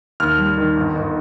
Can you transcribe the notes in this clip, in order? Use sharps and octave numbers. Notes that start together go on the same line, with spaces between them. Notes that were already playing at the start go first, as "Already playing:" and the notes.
D#2 F6
G3
D#3
G1
G1